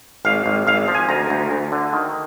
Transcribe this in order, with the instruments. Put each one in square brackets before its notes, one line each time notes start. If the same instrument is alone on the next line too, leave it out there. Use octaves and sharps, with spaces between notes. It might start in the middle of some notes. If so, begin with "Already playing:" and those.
[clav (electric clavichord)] G#1 F5
G#1
G#1 F5
F3
G#5
D2 A#5
D2
D2
D3
D#3